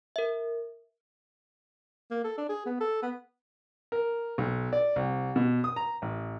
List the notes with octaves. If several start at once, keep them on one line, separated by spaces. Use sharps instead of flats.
A#4 E5
A#3
A4
D4
G#4
B3
A4
B3
A#4
B1
D5
C2
B2
D#6
A#5
A1